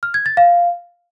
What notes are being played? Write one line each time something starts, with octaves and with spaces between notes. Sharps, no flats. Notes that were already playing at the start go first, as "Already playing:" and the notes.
F6
G#6
A6
F5